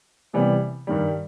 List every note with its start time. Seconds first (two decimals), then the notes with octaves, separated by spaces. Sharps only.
0.33 C3 E3 G3 B3
0.87 G2 D#3 G3